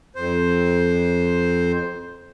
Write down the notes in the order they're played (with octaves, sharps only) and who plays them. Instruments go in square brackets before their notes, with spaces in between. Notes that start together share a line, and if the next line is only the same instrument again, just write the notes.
[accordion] F2 C5